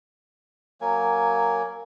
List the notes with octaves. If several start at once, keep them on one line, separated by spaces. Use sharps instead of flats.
F#3 A#3 A#4 G#5